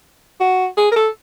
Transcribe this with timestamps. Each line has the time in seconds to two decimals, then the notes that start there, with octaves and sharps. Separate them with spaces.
0.40 F#4
0.77 G#4
0.92 A#4
0.96 A4